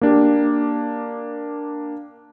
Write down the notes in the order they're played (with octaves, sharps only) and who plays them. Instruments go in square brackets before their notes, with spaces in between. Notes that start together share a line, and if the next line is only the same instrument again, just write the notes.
[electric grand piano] A#3 D4 G4